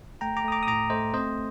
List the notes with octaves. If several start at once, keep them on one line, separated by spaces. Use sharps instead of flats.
A3 G5 A#5
A#5 D6
A3 D#6
A#5 D6
D#6
A2 A#5 D6
A3 C5 D#5
C4 C5 D#5